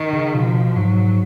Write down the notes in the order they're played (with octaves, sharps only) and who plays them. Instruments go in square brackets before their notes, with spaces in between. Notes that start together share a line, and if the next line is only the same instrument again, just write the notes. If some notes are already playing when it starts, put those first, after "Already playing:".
Already playing: [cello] D#3
[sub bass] C#3
[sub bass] B2 [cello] F3
[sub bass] G#2 [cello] F#3